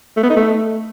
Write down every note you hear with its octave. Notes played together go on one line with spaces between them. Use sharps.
A3
B3
D#4
A3